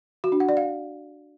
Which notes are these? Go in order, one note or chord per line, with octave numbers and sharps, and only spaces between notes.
F#4
D4
F#5
D5
F5